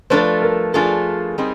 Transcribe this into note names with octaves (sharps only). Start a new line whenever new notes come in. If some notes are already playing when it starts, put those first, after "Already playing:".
F3 A3 D4 F4 A4 B4
A#4
F3 A3 D4 F4 G#4 A4
G3 C4 D#4 G#4